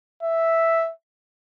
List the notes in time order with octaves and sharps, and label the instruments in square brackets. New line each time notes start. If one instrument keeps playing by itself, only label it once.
[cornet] E5